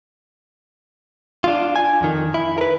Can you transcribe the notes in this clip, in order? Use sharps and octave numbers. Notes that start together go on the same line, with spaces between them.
D4 F4
G#5
F2 D#3
E4
A#4 B4